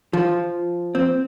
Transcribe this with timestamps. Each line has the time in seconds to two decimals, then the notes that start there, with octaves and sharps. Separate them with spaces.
0.13 F3
0.95 C4